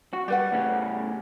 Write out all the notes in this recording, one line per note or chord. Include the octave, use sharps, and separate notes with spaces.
F#4
G3 G4 B4 F#5
A2 C#3 C#4